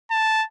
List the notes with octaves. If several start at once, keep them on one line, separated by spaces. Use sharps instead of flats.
A5